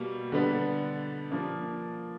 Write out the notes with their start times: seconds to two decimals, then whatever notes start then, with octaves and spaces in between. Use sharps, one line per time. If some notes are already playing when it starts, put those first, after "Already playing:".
Already playing: B2 G3 A#3
0.32 D3 G3 B3 D4
1.31 F3 A#3 D4